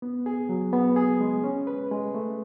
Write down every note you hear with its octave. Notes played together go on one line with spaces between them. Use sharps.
B3
G#4
F#3
B3
G#4
G#3
C#4
B4
G#3
A3